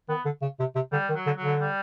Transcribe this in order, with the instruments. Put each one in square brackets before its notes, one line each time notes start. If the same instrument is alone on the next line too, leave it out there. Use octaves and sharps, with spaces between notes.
[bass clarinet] D#3 [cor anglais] B3
[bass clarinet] D3
C#3
C3
C3
[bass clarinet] D3 [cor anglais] G3
[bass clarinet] D#3
[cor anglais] F#3
[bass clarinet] D3
[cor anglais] F#3
[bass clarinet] D3
[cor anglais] G3